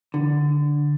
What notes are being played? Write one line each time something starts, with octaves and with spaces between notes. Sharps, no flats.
D3